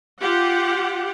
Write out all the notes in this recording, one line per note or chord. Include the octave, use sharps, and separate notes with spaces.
F4 G4 F#5